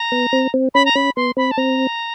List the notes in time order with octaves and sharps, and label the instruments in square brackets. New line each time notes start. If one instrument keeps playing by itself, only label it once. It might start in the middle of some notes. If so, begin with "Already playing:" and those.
Already playing: [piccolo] A#5
[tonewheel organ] B3
C4
C4
[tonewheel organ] C#4 [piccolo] B5
[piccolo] A#5
[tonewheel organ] C#4 [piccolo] B5
[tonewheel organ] B3 [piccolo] C6
[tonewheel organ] C4 [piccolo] B5
[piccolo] A5
[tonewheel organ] C4 [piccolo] A#5